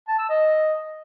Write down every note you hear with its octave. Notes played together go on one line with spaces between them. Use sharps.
A5
E6
D#5